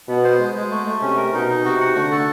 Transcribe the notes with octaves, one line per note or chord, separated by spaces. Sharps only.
B2 B3
C5
G#3
G#3
A3
A3
C3 C#4
A#4
B2 D#4
D#4
C3 F#4
F#5
D3 A3
A4